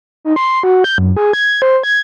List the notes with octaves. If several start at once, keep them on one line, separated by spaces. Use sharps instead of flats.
D#4
C6
F#4
G6
F#2
G#4
G#6
C5
G#6